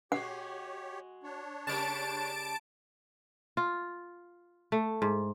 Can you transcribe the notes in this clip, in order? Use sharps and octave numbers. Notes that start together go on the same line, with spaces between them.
G#3 F#4 G4 C#5 F#5
D4 C#5
C#3 G3 A#3 A5 D7
F4
A3
G#2